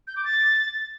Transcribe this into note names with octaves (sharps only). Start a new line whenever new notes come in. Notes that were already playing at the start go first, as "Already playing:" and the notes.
G6
D6
A6